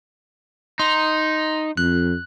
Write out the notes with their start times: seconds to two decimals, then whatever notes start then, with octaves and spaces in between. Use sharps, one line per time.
0.79 D#4 C6
1.77 F2 F#6